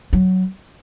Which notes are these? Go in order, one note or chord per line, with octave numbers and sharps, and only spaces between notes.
F#3